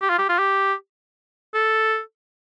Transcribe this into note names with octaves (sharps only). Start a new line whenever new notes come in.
G4
F4
G4
F4
G4
A4